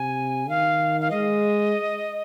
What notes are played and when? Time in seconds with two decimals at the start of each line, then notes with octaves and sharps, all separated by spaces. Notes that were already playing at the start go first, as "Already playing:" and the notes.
Already playing: C3 G#5
0.49 D#3 F5
1.01 F5
1.11 G#3 D#5